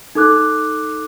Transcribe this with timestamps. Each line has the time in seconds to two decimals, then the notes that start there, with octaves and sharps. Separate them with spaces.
0.15 D#4 A4 D6 F#6